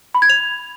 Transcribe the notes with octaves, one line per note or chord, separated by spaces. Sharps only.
B5
G#6
F7